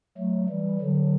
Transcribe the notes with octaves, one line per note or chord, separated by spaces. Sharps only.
F#3 A3
E3 G3
D3 F#3